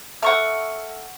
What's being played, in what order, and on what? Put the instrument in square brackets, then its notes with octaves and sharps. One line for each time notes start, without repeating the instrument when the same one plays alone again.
[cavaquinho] A4 E5 D6 [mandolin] F#5 C#6 F6